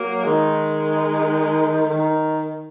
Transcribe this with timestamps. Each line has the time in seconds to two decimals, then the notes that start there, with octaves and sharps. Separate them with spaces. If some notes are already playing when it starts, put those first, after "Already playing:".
Already playing: F#3 A#3
0.23 D#3 G#3
1.90 D#3